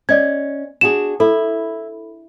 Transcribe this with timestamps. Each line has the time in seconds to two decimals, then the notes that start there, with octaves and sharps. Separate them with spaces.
0.09 C#4 D5 D#5 G#6
0.81 D4 F#4 G#4 E7
1.20 E4 A4